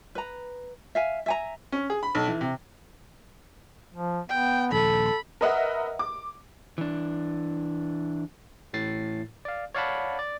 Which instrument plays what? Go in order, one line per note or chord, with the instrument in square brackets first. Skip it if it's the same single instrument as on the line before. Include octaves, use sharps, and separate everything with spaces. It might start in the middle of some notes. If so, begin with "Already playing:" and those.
[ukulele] B4 A#5
E5 F5 G#5
E5 G#5 A#5
[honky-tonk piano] C#4
G#4
B5
B1
E3
C3
[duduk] F3
[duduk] B3 [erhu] G5
[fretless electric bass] D#1 A#1 [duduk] A4 [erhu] B5
[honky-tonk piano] A#4 B4 D#5 E5 F#5
D6
[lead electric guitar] E3 D4
[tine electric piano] A1 A2 A6 C7
D5 F5
C#5 D5 F5 F#5 A5 B5
D5